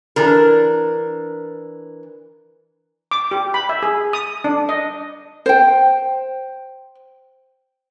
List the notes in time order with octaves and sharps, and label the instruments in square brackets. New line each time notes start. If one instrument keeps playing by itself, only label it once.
[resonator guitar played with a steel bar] E3 D4 A#4
[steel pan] D6
G4
B5
E5
G#4
D#6
D4
D#5
[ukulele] C5 G5